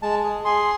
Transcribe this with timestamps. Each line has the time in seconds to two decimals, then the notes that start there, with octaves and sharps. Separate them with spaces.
0.02 G#3 A5
0.24 G#4
0.45 G#4 C6